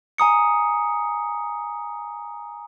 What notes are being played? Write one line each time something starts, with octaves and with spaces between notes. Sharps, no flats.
G#5 A#5 D#6 C#7